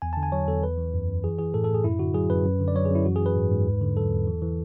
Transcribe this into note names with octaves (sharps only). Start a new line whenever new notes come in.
E2 G#5
D3 A5
G#5
F#3 C#5
E2 A4
E3 B4
E3
F#2
F#2
E3 G#4
E3 G#4
A2 A4
A2 A4
G#4
F#2 E4
D3 F#4
F#3 G#4
F#2 B4
F#2
D3
D5
F#3 C#5
G#4
F#2
E4
E3 F#4
G#4
E3 B4
G#2
G#2
E2
D3
F#3 A4
E2
E3
E3